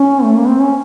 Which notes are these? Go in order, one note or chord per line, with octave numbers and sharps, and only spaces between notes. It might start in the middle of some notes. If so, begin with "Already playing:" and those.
Already playing: C#4
A3
A#3
C4
C#4